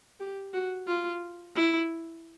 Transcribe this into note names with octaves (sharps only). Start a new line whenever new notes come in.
G4
F#4
F4
E4